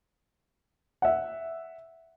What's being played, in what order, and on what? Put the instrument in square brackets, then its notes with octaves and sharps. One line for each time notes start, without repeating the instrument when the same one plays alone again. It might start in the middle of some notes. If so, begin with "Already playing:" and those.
[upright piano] E5 F#5